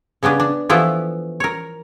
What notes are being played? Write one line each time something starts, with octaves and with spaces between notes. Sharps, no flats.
C#3 B3 C#4 D4 B4
D4
E3 F3 A3 B3 E4 F4
A#4 C#5